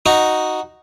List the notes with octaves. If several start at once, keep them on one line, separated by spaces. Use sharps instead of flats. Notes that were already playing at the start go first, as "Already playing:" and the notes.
D#4 F#4